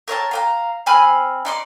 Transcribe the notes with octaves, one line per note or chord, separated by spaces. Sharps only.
A#4 C#5 E5 A5
F5 G5 A#5
C4 G#5 B5 F6
D#4 D5 C6